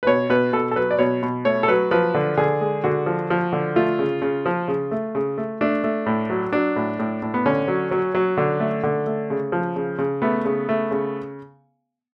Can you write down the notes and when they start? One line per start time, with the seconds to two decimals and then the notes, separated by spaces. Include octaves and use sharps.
0.03 B4
0.07 B2 C#5
0.30 B2 B4
0.53 B2 A4
0.71 A4
0.76 F#3 B4
0.91 D5
0.99 B2 C#5
1.23 B2
1.45 A3 C#5
1.63 A4
1.68 F#3 B4
1.91 F3 B4
2.14 D3
2.37 D3 G#4
2.61 G#3
2.84 D3 F#4
3.06 F3
3.30 F3
3.52 D3
3.76 A3 F4
3.99 C#3
4.22 C#3
4.46 F3
4.68 C#3
4.91 A3
5.15 C#3
5.38 A3
5.61 A3 D4
5.84 A3
6.06 A2
6.30 F#3
6.52 F#3 D4
6.76 A2
6.99 A2
7.22 A2
7.34 B3
7.46 D3 C#4
7.68 F#3
7.91 F#3
8.15 F#3
8.37 D3
8.60 A3
8.83 D3
9.07 A3
9.30 C#3
9.52 F3
9.76 C#3
9.98 C#3
10.22 A3 B3
10.45 C#3
10.69 A3
10.91 C#3